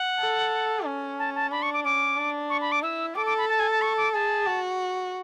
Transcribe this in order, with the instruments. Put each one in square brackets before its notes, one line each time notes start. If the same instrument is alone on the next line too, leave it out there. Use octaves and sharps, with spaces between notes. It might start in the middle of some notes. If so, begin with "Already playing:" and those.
Already playing: [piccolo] F#5
[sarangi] A4
C#4
[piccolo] A5
A5
[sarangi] D4 [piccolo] B5
[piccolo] C#6
D6
[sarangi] C#4 [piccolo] D6
[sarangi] D4
[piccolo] C#6
B5
D6
[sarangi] E4 [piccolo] E6
[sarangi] A4 [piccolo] D6
[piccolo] D6
B5
A5
G#5
A5
C#6
D6
[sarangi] G#4 [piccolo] A5
[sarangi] F#4